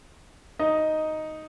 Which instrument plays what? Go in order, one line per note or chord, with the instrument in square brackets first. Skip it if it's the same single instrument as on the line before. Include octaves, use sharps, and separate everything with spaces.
[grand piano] D#4 D#5